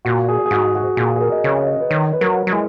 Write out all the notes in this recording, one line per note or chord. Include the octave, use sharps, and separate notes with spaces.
A#2 F#4
G#4
G#4
G#2 F#4
F#4
A#2 G#4
G#4
A#4
D#5
C#3 C#5
D#5
B4
D#3 C#5
B4
F#3 A#4
F#3
G#3 E4